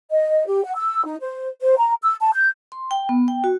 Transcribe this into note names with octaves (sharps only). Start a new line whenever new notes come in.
D#5
G4
F#5
E6
D#4
C5
C5
A#5
E6
A5
G6
C6
G5
B3
G5
F#4